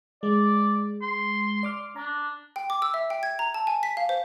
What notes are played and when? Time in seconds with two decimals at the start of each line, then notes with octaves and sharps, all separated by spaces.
0.23 G#3 D5
1.02 C6
1.63 D5 D6 F6
1.96 D4 A#5
2.56 G5
2.70 D6
2.82 E6
2.94 E5
3.10 G5
3.23 G#6
3.39 A#5
3.54 A5
3.67 G#5
3.83 B6
3.97 F5
4.09 C5